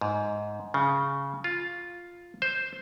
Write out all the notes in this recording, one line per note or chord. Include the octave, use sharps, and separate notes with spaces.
G#2
C#3
F4
C5